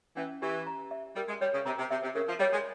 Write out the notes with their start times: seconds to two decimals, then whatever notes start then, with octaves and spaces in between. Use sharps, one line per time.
0.17 E3 C#4
0.42 E3 G4
0.67 A#5
0.91 E5
1.16 G3 A#4
1.29 G#3
1.41 G3 C#5
1.54 C#3
1.66 C3 A#5
1.78 C3
1.91 C3 E5
2.03 C3
2.15 C#3 A#4
2.29 F3
2.40 G3 C#5
2.52 G#3